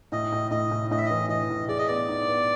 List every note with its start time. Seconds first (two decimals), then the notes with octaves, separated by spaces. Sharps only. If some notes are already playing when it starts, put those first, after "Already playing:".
0.12 A2 D#5
0.32 A2
0.51 A2 D#5
0.71 A2
0.91 A2 D#5
0.98 E5
1.06 E3 D#5
1.29 E3 D#5
1.50 A2
1.68 G#4 D5
1.78 D#5
1.88 B3 D5
2.08 D#4
2.28 B3